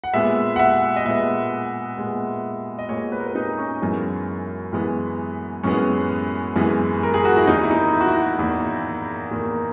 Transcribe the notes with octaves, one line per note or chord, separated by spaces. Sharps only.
F#5
A#2 G#3 B3 E5
F#5
E5
D#5
A#2 G#3 B3 E5
A#2 G#3 B3
D#5
A#2 G#3 B3 C#5
B4
A#4
B4
D#4
C#4
F#2 E3 G#3 B3
F#2 E3 G#3 B3
F#2 E3 G#3 B3 C#4
F#2 E3 G#3 B3
A#4
G#4
F#4
E4
E2 D#3 A#3 D#4
E4
D#4
E4
F#4
E4
F#4
E2 D#3 A#3
E2 D#3 A#3